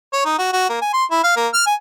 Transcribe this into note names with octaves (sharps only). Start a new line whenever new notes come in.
C#5
D#4
F#4
F#4
A#3
G#5
C6
E4
F5
A#3
F6
G#5